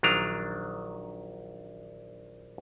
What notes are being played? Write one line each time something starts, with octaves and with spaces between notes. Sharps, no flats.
A#1 D#3 F#3 D4 A#5